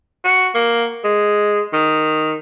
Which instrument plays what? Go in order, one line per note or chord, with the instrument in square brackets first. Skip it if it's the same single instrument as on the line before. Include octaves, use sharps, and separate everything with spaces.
[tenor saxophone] F#4
A#3
G#3
D#3